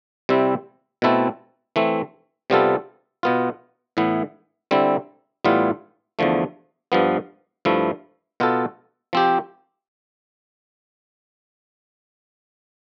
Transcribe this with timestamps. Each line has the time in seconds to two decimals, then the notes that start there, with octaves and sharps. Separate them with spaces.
0.29 C3 G3 C4 E4
1.02 B2 A3 C4 E4 A4
1.76 E3 A3 C4
2.50 C3 G3 B3 F4 A4
3.23 B2 B3 F4
3.97 A2 E3 B3
4.71 D3 G3 C4 E4
5.45 A2 E3 G3 B3 F4
6.19 E2 D3 F3 A3
6.92 G2 F3 B3
7.65 G2 F3 A3 E4
8.40 B2 B3 F4 A4
9.13 F3 C4 G4